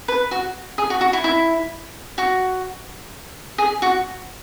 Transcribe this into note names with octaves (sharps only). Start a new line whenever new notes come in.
B4
F#4
G#4
F#4
F#4
E4
E4
F#4
G#4
F#4